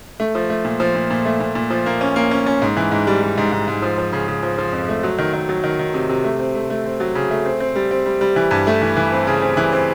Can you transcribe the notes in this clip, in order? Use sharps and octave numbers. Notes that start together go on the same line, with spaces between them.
A3
F3
A3
A#2
F3
A#2
A#2
A3
A#2
A#2
F3
A#3
C#4
A#3
C#4
C#4
G#2
E3
G#2
G3
G3
G#2
G#2
G#2
F3
F3
C#3
C#3
F3
F3
F2
A3
F#3
D#3
D#3
F#3
D#3
D#3
C3
C3
A3
C4
A3
A3
C4
F#3
C#3
A3
C4
C4
G3
C4
G3
G3
E3
G2
A3
E3
E3
C4
C#3
C4
E3
C4